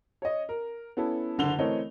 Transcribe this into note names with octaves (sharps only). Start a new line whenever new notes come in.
C#5 D#5
A#4
B3 C#4 E4 A4
F#1 D3 F7 G7
E3 A3 C4 A#4 C#5 D#5